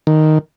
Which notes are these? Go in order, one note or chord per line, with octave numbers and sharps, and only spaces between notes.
D#3